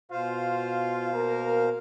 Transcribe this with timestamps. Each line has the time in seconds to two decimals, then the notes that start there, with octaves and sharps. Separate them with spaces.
0.11 B2 F4 C5 F5
1.13 A#3 A#4